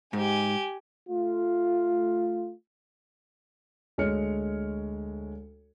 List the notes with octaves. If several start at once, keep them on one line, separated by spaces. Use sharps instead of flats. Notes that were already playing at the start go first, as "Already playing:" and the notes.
G#2 G4 G#5
A3 F4
D2 G#3 C#5 F6 C#7